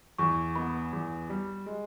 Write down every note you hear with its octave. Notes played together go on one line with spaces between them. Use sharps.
E2 C#6
B3 B5
E2
G3
G#3